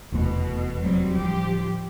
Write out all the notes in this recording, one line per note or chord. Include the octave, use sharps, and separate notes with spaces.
F1 E2 B2 A3
F#3 G3 C4
D1 F3 G4